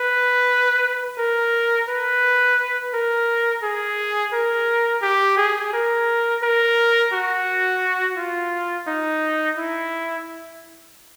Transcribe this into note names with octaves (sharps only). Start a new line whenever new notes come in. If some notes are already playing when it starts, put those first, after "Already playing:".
Already playing: B4
A#4
B4
A#4
G#4
A#4
G4
G#4
A#4
A#4
F#4
F4
D#4
E4